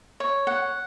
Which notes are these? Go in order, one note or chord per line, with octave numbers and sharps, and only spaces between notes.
C#5
F#5